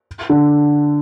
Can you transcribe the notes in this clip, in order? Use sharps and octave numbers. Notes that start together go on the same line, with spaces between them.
D3